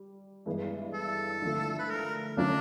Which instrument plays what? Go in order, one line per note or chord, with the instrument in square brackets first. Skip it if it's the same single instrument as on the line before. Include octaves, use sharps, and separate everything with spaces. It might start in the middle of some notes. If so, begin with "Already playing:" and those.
Already playing: [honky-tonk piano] G3
G2 E3 G#3 B3 E4
[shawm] A4
[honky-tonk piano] D3 F3 A3
[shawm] B4
A#4
[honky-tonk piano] D3 F#3 A3 C#4 F4 [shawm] D4